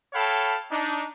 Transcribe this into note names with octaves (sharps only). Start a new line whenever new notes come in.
A4 C#5 F5 G5 A5 B5
D4 D#4